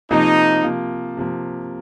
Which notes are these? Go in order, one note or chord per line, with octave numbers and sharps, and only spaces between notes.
C3 F3 A#3 D#4
C3 F3 A#3
C3 F3 A#3